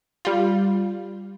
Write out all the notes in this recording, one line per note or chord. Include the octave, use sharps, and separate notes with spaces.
G3 F4